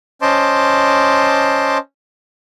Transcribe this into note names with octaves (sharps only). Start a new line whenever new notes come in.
C#4 C5 D#5 A5 C6 D6